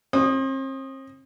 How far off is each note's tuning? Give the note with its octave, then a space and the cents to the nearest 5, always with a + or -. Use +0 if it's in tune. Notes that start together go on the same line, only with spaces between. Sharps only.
C4 +40 D#6 -10